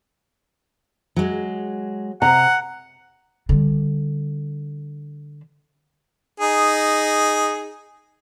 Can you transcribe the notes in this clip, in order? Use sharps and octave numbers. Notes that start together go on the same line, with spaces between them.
F#3 G#3
C3 C4 F#5 A#5
D3 G3
D#4 G#4